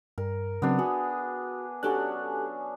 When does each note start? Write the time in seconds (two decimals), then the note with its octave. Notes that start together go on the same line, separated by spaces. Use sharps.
0.18 G2 A#4
0.62 C#3 F#3 B3 C4 D4
0.79 F#4 G#4
1.83 F#3 C#4 D4 G4 A4 F#6